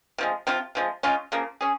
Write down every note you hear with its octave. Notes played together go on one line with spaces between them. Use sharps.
C3 F3 G#3
C3 F3 C4 F4
C3 F3 G#3
C#3 G#3 C#4 F4
C#3 F3 A#3
C#4 G#4